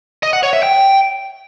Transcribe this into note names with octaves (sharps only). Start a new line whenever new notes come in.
D#5
F#5
C#5
E5
G5